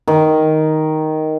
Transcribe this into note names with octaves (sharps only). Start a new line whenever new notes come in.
D#3